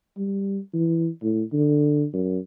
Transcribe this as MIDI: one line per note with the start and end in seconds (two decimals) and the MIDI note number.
0.17 0.58 55
0.74 1.08 52
1.23 1.43 45
1.53 2.05 50
2.13 2.39 42